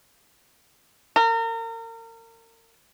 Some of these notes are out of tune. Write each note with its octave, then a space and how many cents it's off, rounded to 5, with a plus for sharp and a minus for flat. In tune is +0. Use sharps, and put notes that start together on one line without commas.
A#4 -35